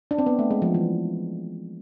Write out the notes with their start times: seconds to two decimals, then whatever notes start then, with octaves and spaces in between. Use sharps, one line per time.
0.11 D4
0.18 C4
0.26 B3
0.39 A3
0.51 G#3
0.62 F3
0.74 E3